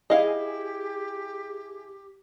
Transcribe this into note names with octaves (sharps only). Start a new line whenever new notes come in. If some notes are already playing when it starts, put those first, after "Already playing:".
E4 G4 G#4 D#5 F5